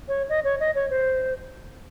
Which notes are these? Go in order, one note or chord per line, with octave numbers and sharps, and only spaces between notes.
C#5
D#5
C#5
D#5
C#5
C5